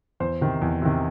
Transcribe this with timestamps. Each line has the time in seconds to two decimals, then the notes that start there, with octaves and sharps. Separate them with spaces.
0.20 E2 C5
0.41 C3 D#3
0.62 E2
0.82 C3 D#3